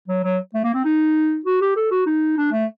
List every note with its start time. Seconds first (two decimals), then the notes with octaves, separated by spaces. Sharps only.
0.08 F#3
0.24 F#3
0.54 A3
0.64 A#3
0.74 C4
0.85 D#4
1.45 F#4
1.61 G4
1.76 A4
1.91 F#4
2.06 D#4
2.37 D4
2.52 A3